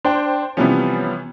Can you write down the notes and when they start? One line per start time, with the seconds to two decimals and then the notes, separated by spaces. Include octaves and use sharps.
0.05 D4 C5 G5
0.57 C3 E3 F3 G3 B3 C#4